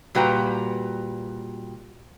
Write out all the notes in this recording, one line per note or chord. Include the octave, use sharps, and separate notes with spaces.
A#2 G3 F#4 B4 G5 A#5